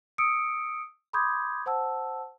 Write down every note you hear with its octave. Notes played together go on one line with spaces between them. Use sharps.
D#6 E6 C#7 D7
B5 C6 D6 D#6 G6 G#6
C5 F#5 A5 E6